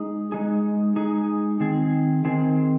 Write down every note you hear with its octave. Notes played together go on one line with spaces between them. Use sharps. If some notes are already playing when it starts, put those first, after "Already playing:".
Already playing: G#3 D#4 G#4
G#3 D#4 G#4
G#3 D#4 G#4
D#3 C4 G#4
D#3 C4 G#4